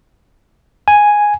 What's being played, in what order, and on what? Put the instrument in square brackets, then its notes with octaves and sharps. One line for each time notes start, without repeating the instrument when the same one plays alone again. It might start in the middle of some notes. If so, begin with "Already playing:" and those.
[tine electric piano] G#5